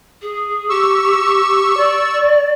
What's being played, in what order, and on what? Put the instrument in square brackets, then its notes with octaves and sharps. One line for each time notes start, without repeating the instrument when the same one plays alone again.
[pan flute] G#4
[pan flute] G4 [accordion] C#6 E6
[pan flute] D5